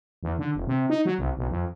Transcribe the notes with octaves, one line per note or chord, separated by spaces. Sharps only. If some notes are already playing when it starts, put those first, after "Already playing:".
E2
D3
F1
C3
D#4
F#3
C2
B1
F2